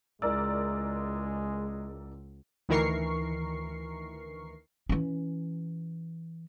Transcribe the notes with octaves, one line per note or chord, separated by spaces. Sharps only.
C#2 G#3 E4 A#4 D5 E6
D2 D#3 E3 A#4 C#6 C7
E3 C#4